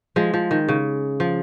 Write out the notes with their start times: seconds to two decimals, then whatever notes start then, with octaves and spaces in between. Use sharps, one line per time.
0.16 F3 G#3
0.33 F3
0.51 D#3
0.68 C#3
1.20 F3